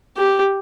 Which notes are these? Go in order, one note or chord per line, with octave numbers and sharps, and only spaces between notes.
G4